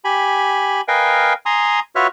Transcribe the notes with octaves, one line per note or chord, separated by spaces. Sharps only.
G4 G#5 B5
A#4 B4 D#5 F5 G5 G#5
G#5 A#5 C6 D#6
F4 F#4 B4 C#5 E5 F6